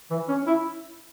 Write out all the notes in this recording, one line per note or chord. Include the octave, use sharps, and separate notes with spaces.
E3
C#4
E4